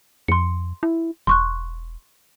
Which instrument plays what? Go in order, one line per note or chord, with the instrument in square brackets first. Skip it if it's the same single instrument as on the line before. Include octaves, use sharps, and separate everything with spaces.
[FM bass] F2 [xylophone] C6 C#7
[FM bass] E4
[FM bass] E1 [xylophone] C6 C#6 F#6